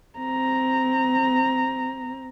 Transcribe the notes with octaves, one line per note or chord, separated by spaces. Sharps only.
C4 A#5